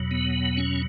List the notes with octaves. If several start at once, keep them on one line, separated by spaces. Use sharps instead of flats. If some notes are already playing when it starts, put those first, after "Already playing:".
Already playing: E2 B2 F#3
B3
C#4